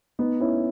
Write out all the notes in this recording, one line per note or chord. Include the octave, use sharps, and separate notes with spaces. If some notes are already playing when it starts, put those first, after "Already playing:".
B3 D#4
C#4 E4